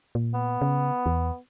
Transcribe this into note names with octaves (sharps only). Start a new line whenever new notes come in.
A#2
B3
C#3
E2